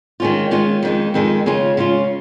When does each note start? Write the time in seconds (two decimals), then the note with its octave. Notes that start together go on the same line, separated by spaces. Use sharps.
0.20 D#3 G#3 C#4 F4
0.51 D#3 G#3 C#4 F4
0.83 F2 D#3 G#3
1.14 F2 D#3 G#3
1.46 C#3 G#3 C#4 F4
1.77 C#3 G#3 C#4 F4